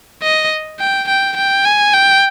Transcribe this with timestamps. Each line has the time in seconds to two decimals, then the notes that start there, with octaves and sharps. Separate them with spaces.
0.23 D#5
0.80 G5
1.08 G5
1.37 G5
1.65 G#5
1.94 G5